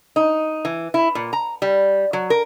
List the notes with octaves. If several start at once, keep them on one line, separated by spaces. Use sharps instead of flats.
D#4
E3
E4
A#2
A#5
G3
F#3
A#4